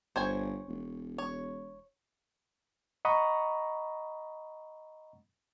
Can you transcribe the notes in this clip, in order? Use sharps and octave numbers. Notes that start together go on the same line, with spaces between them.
G1 C5 C#5 G#5
E1
C#5
D#5 F#5 A#5 B5 C#6 D#6